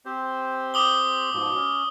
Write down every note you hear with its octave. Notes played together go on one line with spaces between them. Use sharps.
C4 G4 C5
D6 D#6 G7
G#2 B2 F3
C#4